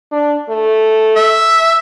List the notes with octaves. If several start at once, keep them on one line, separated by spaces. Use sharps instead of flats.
D4
A3
E5